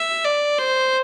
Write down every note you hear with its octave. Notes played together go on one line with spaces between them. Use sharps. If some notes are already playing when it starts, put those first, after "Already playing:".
Already playing: E5
D5
C5